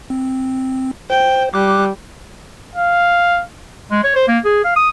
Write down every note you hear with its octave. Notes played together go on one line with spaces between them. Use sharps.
C4
C5 G5
G3 D6 F#6
F5
G#3
C#5
C5
A#3
G#4
F5
D#6